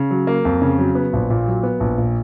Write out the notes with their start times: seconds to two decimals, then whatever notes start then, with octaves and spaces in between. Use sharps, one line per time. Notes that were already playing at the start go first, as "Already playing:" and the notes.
Already playing: C#3
0.11 F#3
0.27 A#3
0.45 F2
0.62 C#3
0.79 F#3
0.95 B3
1.13 A#1
1.30 A#2
1.47 F#3
1.63 B3
1.80 A#1
1.98 A#2